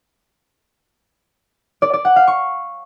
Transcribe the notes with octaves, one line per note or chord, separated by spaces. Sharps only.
D5
D5
F#5
F5
C#6